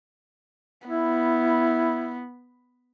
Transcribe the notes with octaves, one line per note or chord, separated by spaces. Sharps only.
B3 E4